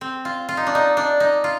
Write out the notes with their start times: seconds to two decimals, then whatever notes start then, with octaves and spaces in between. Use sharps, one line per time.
0.01 C4
0.25 F4
0.49 F4
0.57 D#4
0.67 D4
0.75 D#4
0.97 D4
1.20 D#4
1.44 F4